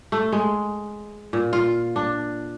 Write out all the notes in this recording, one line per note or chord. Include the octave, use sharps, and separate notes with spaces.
A3
G#3
A#2
F4
D4